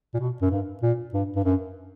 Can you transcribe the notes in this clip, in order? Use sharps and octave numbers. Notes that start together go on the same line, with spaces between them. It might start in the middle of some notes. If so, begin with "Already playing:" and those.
A#2
B2
F#2
G2
A#2
G2
G2
F#2